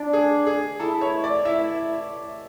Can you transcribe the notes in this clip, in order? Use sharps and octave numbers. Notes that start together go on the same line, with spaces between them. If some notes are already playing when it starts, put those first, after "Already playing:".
Already playing: D4
G#4
G#4
E4 A4
C#5
D5
E4 E5